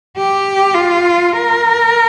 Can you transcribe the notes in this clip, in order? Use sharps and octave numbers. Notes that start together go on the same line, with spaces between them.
G4
F4
A#4